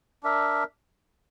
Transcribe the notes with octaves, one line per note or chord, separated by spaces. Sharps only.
D4 A#4 E5